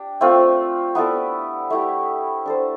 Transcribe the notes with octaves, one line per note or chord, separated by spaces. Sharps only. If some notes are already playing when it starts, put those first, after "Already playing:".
Already playing: D4 G4
A3 C4 F4
B3 E4 A4 D5
A3 E4 G4
D4 A4 C5